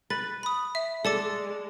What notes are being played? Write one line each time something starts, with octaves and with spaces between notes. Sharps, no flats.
B4 A6
B5 D#6
E5
G#3 A4 D5 A5 D6